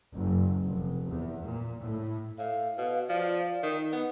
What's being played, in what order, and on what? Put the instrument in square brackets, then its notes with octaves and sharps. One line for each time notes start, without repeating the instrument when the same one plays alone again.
[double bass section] F#1
F1
E2
A#2
A2
[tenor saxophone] A2 [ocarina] F5
[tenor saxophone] B2
[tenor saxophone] F3 [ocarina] D5
[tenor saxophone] D#3 [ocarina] D#4
[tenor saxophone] B3